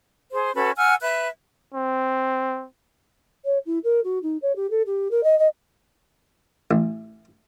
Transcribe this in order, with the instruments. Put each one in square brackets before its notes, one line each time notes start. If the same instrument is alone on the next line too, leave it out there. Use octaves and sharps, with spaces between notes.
[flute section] G#4 C5
C#4 F#4 A4 B4
F#5 G#5 E6 F6
B4 E5 F#6
[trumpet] C4
[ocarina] C#5
E4
A#4
F#4
D#4
C#5
G4
A4
G4
A#4
D#5
D#5
[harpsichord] A1